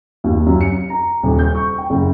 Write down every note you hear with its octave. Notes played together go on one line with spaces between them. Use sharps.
D#2
F#2
C#7
A#5
D#1
G6
C#6
G5
F#1